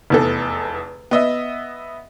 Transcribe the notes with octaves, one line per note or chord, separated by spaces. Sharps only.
F1 E2 A4
B3 D#5 E5